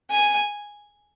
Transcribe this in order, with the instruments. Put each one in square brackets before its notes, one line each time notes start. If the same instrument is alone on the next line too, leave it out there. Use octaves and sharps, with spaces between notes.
[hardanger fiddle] G#5